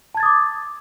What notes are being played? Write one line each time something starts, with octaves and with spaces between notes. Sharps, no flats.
A5 D6 D#6 G#6 A6